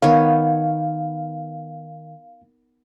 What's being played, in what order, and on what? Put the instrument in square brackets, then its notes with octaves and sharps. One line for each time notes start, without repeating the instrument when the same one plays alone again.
[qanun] D#3 B3 C#5 [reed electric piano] F5